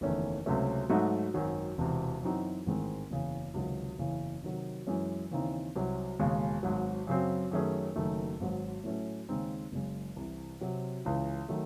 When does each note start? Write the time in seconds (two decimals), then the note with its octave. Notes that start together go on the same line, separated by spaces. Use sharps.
0.01 F#1 E2 D#3 A3 C#4
0.46 C#2 C3 F#3 A3 C#4
0.89 G#2 F#3 A3 D#4 F#4
1.34 G#1 F#2 D#3 F#3
1.78 E1 E2 C3
2.22 F#2 E3 C4 D#4 F#4
2.66 A1 G#2 D#3 G#3 C4
3.10 F#1 E2 C#3
3.54 C#2 C3 D#3 F#3
3.99 F#1 E2 C#3 E3
4.43 C3 D#3 F#3
4.87 F#2 E3 G#3 C#4
5.31 D#2 C#3 E3 C4 D#4
5.75 C2 C3 F#3
6.19 E1 D#2 C#3 G#3
6.63 G#1 G#2 F#3
7.07 F#2 C#3 F#3 C4
7.51 F#2 D#3 A3 C#4 G#4
7.96 F#1 F#2 D#3 A3
8.40 G#1 G#2 F#3
8.84 A2 F#3 A3 C#4
9.29 D#2 C#3 G#3 C4 D#4
9.72 F#1 F#2 C#3 G#3
10.16 C2 C3 E3
10.61 C3 F#3 C4
11.05 C#2 C#3 E3
11.49 D#3 F#3 A3